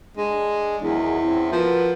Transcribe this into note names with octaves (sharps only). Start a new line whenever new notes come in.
G#3 D4
E2 D#3 F#3 G#4
C4 C#4 E4
F3 F#4 A#4 B4